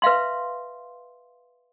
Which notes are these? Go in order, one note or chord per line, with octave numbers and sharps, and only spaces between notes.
B4 E5 F5 C6